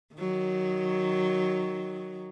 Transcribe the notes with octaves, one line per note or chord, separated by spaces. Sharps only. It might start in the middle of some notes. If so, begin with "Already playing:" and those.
D#3 F#3